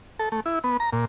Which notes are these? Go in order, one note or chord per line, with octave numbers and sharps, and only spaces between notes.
A4
A3
E4
B3
A#5
A#2